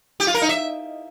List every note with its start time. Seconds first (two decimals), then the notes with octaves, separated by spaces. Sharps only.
0.20 G4
0.27 F4
0.34 A#4
0.42 D#4
0.49 E5